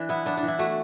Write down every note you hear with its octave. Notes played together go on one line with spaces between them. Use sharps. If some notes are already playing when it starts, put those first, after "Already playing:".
Already playing: E3 D4
B3 E4
B3 D4
D4
E3
E4
A3 F#4